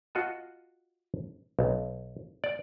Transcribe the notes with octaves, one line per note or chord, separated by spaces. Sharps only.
F4 F#4 D#5 A5
B1
D5